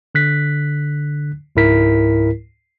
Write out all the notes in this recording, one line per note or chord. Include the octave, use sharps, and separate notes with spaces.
D3 F#6 B6
C#2 G#2 E4 A#4 B6